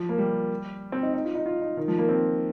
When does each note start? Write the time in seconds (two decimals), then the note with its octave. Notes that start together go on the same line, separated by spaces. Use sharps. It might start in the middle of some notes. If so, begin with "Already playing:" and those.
Already playing: F3
0.09 A#3
0.18 G3
0.92 C4
1.03 D#4
1.14 D#4
1.25 F4
1.35 D#4
1.46 F4
1.61 D#4
1.77 D#3
1.88 F3
1.98 A#3
2.09 C4